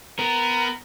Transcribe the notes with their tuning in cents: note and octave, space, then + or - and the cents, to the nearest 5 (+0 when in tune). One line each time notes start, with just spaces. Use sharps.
B3 +20 A#4 +0